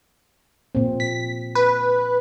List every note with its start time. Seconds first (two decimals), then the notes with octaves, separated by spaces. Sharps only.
0.75 A#2 C4
1.00 B6
1.55 B4